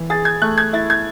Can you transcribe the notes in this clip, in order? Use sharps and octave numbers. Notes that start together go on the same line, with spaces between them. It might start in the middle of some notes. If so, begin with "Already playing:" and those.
Already playing: E3
G#4 A6
G#6
A3 F#6
G#6
E4 A6
G#6